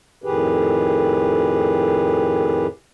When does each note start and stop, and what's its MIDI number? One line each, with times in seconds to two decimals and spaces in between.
0.24 2.67 41
0.24 2.67 45
0.24 2.67 51
0.24 2.67 67
0.24 2.67 68
0.24 2.67 71